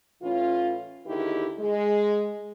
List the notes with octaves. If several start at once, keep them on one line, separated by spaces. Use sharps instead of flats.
A2 E3 C#4 F4
D#2 D3 D#3 E4 G4 G#4
G#3